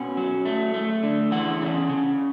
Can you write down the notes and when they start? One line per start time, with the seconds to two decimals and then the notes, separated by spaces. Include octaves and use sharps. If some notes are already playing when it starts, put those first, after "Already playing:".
Already playing: B2 C#4 F#5
0.17 F#3
0.45 A3
0.74 A3
1.03 D3
1.31 E3 F#5
1.61 C#3
1.90 C#3